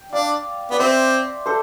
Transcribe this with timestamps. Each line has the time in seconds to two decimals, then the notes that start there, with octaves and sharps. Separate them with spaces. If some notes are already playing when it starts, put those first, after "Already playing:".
Already playing: G5
0.12 D4 D5 F5
0.70 B3 D5
0.79 C4 C5 E5
1.46 A4 C5